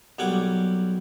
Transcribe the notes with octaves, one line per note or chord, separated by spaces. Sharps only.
B1 G3 A#3 F#5 G#5 D6